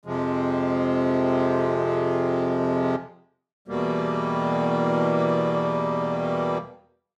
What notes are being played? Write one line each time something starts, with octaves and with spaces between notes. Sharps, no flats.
F2 C3 F3 G#3
E2 B2 G3 A#3